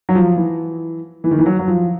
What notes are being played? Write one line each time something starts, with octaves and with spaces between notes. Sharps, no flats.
F#3
F3
E3
E3
D#3
E3
F#3
F#3
F3